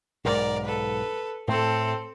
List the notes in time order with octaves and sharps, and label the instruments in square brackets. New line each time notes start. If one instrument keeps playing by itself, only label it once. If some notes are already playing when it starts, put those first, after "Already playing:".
[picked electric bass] B1 G#2 [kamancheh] A#4 D5
[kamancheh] A4 B4
[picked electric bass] A2 A3 [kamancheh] C4 A4